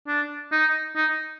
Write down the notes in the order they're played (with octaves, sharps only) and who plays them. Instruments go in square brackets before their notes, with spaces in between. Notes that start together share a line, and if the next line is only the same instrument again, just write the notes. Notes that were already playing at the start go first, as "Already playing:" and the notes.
[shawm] D4
D#4
D#4